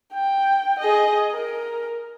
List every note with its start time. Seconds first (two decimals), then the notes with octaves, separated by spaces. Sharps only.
0.13 G5
0.79 G#4 D#5
1.33 A#4